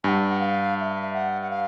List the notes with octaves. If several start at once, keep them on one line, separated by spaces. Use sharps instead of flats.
G2 F#5 G#5
F#5
F5
F5
E5
F#5
F#5
F5